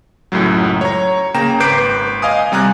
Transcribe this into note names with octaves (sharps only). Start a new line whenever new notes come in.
C#2 F#2 A2 F#3
C#5 A#5
C#3 A#3 G5 A#5 E7
G#1 B4 D6 G6 C7 D7
D#5 F5 G#5 D#6
C3 G3 G#5 A#5 F#6